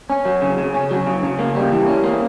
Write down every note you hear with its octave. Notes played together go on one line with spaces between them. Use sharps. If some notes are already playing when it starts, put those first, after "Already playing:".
C#4
F#3
C#3
C#3
C#4
F#3
C#3
C#3
A#3
G3
E3
C#4
A#3